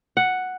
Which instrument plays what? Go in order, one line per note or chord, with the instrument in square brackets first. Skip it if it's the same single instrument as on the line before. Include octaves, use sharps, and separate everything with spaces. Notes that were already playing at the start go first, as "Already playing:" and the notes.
[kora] F#5